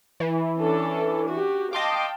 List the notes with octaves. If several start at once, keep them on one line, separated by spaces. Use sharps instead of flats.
E3
C#4 D4 A4
F#4 G4
D#5 F5 G5 A5 C6 D6